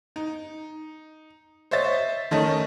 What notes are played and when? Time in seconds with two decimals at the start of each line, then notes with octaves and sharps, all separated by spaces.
0.16 D#4
1.71 C5 C#5 D#5 E5 A6
2.31 D#3 A3 C#4 D#5 A5